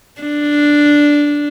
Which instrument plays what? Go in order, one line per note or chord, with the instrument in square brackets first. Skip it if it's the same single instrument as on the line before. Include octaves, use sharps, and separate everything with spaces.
[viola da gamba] D4